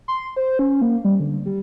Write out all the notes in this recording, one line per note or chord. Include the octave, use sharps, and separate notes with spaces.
C6
C5
C#4
A#3
G3
D3
G3